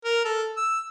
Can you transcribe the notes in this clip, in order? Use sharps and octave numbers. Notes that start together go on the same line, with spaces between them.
A#4
A4
E6